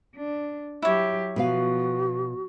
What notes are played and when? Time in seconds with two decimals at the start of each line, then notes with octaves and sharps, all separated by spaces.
0.15 D4
0.82 F#3 E4 G4 C#5
1.36 B2 F3 F#4 B4 F5